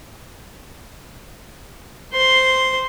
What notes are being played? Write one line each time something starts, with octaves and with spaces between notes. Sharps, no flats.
C5 C6